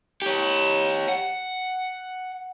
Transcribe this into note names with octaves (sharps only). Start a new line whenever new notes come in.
G4 C#5
F#5